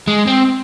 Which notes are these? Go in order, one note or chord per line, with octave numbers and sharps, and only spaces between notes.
G#3
C4